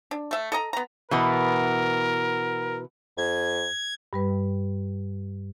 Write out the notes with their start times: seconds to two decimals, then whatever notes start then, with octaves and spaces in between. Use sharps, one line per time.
0.11 D4
0.31 A3 E5
0.52 A4 D#5 A#5
0.73 B3 A#5
1.11 B2 E3 B3 A#4
3.18 F2 G#6
4.13 G2 G3 B4